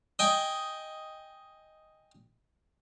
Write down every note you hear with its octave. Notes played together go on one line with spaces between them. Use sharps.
D#5 G5 G#5